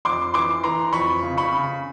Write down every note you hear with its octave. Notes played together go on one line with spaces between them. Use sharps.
F2 C6 D6
E3 C6 D6
E3 A#5 C6
F2 B5 C#6
C#3
B5 C#6
C#3